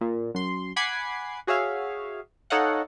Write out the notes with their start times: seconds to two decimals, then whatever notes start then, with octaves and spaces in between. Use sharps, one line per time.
0.01 A#2
0.34 F#2 C6
0.76 F#5 G#5 B5 D6 G#6 C7
1.47 F#4 G#4 C#5 E5 F5
2.50 D#4 A4 C#5 D#5 F5 F#5